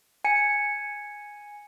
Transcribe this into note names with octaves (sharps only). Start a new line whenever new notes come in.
G#5 C#7